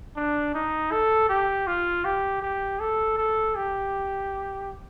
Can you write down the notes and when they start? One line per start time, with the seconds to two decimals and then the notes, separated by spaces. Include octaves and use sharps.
0.16 D4
0.54 D#4
0.92 A4
1.29 G4
1.67 F4
2.05 G4
2.42 G4
2.80 A4
3.18 A4
3.56 G4